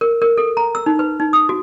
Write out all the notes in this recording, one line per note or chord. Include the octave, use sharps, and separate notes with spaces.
A#4
A#4
A4
A#5
E6
D#4
B4
D#4
D#6
F#4